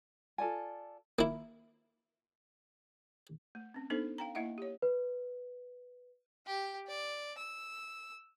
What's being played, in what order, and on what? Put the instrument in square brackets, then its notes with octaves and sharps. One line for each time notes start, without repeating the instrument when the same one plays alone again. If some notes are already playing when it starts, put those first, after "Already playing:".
[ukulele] F4 A4 D5 G#5
[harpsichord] A#3 E4
[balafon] A3
C4 C#4
B3 D4 D#4 A4 C5
F5 G5 A#5
A#3 E4 D#5 E5 F#5
G4 C#5
[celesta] B4
[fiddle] G4 G5
D5
E6